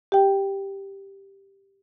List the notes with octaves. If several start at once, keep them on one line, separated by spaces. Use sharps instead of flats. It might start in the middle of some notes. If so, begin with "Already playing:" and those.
G4 G5